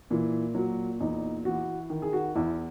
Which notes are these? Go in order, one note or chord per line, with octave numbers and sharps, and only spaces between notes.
A#2 E3
A#2 F#3
E2 D#4
E3 F#4
D#3
G#4
F#4
E2 E4